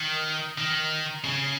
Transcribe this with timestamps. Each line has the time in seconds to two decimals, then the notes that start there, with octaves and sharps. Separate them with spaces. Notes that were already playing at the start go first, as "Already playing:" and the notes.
Already playing: D#3
0.58 D#3
1.24 C#3